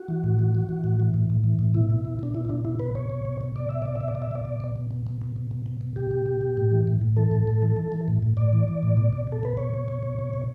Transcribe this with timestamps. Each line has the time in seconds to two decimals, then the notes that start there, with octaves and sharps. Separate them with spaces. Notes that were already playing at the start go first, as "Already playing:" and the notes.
Already playing: F#4
0.08 E3
0.24 A2
0.39 E3
0.55 E3
0.69 E3
0.84 A2
1.00 E3
1.14 A2
1.30 A2
1.44 E3
1.59 A2
1.74 B2 E4
1.90 B2
2.05 B2
2.19 B2 D4
2.34 B2 E4
2.45 E4
2.49 B2 D4
2.65 B2 E4
2.79 B2 B4
2.95 B2 C#5
3.10 B2
3.25 B2
3.41 B2
3.56 B2 D5
3.69 B2 E5
3.82 B2 D5
3.96 E5
4.01 B2
4.08 D5
4.15 B2
4.22 E5
4.31 B2 D5
4.45 B2
4.60 B2
4.76 B2
4.91 B2
5.07 B2
5.22 B2
5.36 B2
5.51 B2
5.66 B2
5.81 B2
5.96 B2 G4
6.11 B2
6.26 B2
6.41 B2
6.57 A2
6.72 E3
6.87 A2
7.01 A2
7.17 E3 A4
7.31 A2
7.47 A2
7.62 E3
7.77 E3
7.92 E3
8.08 A2
8.22 A2
8.37 A2 D5
8.53 E3
8.68 E3
8.83 A2
8.97 B2
9.13 B2
9.27 B2
9.32 A4
9.43 B2 B4
9.57 B2 C#5
9.74 B2
9.88 B2
10.03 B2
10.19 B2
10.33 B2